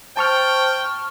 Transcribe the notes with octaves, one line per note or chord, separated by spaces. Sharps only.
C5 G5 A5 C#6 F6